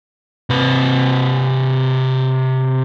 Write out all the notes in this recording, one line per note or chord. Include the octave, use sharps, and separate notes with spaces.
C3 B4